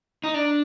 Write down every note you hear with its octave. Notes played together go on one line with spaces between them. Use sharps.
D#4
D4